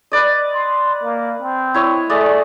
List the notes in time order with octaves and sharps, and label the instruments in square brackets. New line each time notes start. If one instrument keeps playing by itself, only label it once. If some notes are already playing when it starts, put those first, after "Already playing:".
[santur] B4 D5 D#5
[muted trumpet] C6
A#3
C4
[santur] E4 C#5 D#5
[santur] G#3 D5 D#5 [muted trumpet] A3